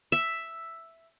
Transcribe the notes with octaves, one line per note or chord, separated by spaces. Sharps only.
E5